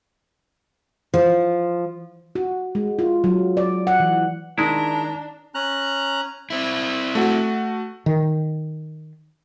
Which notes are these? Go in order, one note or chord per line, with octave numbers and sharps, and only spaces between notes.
F3
F#4
G#3
F4
F#3
D5
F#5
E3
D#3 G#3 D4 E4 A#5
C#4 A#5 F#6
C4 E4
A3 F#4
D#3